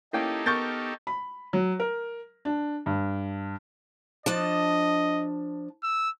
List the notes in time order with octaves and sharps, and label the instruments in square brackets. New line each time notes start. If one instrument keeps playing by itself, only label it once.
[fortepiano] A#3 C#4 G5 [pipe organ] D#4 G4 A4 [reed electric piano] E4
[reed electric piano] B3 [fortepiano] A#4 [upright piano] C#6 G6 A6
[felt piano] B5
F#3
A#4
D4
G2
[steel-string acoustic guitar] F3 D4 A5 [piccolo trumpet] D#5
[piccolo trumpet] E6